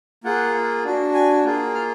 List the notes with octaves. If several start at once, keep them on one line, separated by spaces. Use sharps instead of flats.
A#3 F4 G#4 F#5
D4 F#4
G#5
A#3 F4 G#4
F6